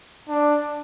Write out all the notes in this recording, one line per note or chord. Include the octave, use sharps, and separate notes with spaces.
D4